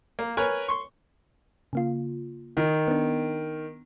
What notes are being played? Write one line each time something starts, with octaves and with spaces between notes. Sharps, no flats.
A#3
A#4 B4 C#5 G#5
C6 C#6
C#3 A#3 F4
D#3
B3 D4